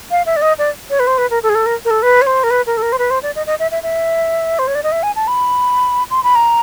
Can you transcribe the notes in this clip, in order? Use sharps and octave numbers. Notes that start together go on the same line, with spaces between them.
F5
E5
D5
D#5
D5
C#5
B4
C5
B4
A#4
A4
G#4
A4
A#4
A#4
A4
B4
C#5
C5
A#4
B4
A#4
A4
A#4
C5
B4
C5
D5
D#5
D#5
E5
E5
E5
C5
C#5
D5
D#5
E5
G#5
A5
B5
C6
B5
A#5